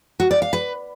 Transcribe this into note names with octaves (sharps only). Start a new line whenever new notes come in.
F#4
D5
F5
B4